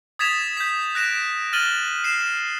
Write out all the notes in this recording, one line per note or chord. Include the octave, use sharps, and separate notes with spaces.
D#6 G#6 A6 B6 E7 F7
G6 B6
F#6 A#6 D7 E7
F6 A6 D#7 F#7 G7
C7 E7